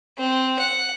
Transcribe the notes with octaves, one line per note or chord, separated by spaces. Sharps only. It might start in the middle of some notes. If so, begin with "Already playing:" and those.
C4
F#5